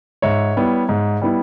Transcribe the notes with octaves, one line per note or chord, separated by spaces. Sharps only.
G#2 C#5 E5
G3 B3 E4
G#2
G3 B3 E4